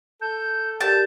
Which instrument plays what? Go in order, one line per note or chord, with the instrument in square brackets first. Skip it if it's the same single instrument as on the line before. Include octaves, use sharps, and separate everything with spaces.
[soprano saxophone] A4 [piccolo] G6
[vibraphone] G4 A#4 D5 [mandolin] A5 [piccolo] G6